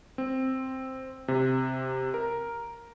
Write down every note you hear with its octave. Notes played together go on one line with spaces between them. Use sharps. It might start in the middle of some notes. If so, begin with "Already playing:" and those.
C4
C3
A#4